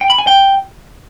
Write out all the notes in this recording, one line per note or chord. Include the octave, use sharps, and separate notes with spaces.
G5
B5
G#5
G5